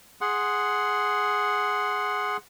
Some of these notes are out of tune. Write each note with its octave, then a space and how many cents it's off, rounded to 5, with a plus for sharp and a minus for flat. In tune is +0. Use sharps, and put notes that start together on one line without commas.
G#4 +0 F#5 +0 C6 +0